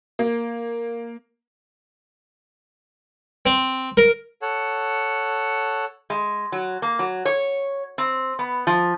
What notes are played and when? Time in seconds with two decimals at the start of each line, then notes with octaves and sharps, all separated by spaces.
0.19 A#3
3.46 C4
3.97 A#4
4.42 A4 C#5 F#5
6.10 G#3
6.52 F#3
6.82 A#3
6.99 F#3
7.25 C#5
7.98 C4
8.39 B3
8.67 F3